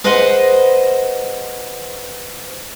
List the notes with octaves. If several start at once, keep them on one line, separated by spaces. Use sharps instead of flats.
G#4 B4 C5 D#5 F#5